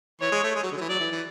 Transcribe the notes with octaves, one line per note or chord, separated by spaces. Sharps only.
E3 C#5
G#3
A3
G#3
F#3
D3
F#3
E3
F#3 D5
E3
E3